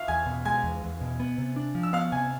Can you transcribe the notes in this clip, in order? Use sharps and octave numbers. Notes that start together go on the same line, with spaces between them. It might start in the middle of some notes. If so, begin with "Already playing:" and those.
Already playing: E5 F5 F6
E2 G#5 G#6
B2
G#3 G#5 G#6
E2
E2
B2
B3
C3
D4
F3
E6
B3 F5 F6
C3 G#5 G#6